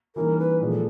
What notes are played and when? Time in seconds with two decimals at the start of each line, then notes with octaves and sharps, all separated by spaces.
0.16 C#3 E3 G3 A#3 D#4 A#4
0.39 B4
0.60 A#2 F3 G#3
0.72 A4